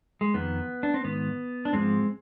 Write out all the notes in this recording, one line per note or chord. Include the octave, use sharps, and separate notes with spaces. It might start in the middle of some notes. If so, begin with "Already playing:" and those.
G#3
F2 D#3 B3
D4
C4
G#2 D#3 B3
D4
G#2 F3 G#3 C4